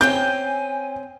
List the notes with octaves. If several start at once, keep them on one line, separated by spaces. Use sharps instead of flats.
C4 C#4 G5 G#5 G6